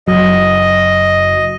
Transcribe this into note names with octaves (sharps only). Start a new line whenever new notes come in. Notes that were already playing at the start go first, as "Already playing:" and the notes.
F#1 F#3 D#5